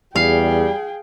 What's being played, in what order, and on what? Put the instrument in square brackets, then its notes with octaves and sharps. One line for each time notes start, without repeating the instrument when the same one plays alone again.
[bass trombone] E2 [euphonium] G3 [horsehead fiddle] G#4 G5 [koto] F5